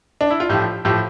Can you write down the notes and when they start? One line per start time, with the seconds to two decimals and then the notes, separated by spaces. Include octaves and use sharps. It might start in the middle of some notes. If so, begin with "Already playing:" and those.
0.21 D4
0.30 E4
0.40 F4
0.49 A2 F3 G4
0.85 A2 F3 G4